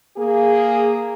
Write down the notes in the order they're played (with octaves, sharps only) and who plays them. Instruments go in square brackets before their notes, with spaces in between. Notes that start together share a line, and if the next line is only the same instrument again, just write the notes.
[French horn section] A#3 G#4